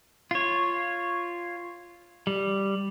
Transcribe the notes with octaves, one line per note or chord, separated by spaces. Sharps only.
F4 C#5
G3